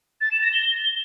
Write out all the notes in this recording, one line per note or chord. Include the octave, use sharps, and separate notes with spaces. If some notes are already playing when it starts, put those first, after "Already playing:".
A6
E7
A#6
G7